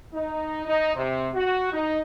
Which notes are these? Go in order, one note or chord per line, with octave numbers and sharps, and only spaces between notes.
D#4
D#4
C3
F#4
D#4